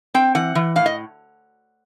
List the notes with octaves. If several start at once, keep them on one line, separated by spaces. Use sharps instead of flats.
C4 G5
E3 F#5
E3
A2 F5
D#5